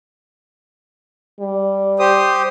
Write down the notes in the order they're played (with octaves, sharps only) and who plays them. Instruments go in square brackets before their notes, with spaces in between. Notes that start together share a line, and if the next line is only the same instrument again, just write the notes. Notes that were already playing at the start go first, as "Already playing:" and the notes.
[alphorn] G3
[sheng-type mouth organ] G4 C5 D#6